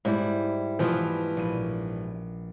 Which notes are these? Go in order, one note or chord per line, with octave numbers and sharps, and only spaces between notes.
G#2 G3 E4
B2 E3 F3 A3
A#1 D#7